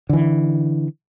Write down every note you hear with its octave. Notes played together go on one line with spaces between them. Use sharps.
D3 E3